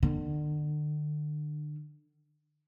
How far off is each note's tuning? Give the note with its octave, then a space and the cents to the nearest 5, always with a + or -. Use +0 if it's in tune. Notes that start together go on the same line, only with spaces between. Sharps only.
D3 +35